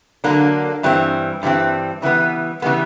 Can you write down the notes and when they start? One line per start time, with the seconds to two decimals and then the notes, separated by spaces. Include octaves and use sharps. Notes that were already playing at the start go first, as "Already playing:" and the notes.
0.24 D3 F#3 A#3 D4
0.83 G2 E3 G3 C4
1.43 G2 E3 G3 C4
2.02 C#3 E3 G3 B3
2.62 C#3 E3 G3 B3